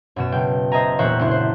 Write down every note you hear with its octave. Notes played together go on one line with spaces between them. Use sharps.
F#2 B2 E7
F#1 G5
C5 D#5 E5 G#5 A#5
E1 A#2 C5 C#5 E5 F#6
F#1 D4 E4 C6 F#6
C5